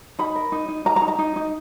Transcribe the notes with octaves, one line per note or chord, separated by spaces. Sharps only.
D#4 B5
A#4
D#4
D#4
D#4 A#5
A#5
D#4
A#5
D#4
D#4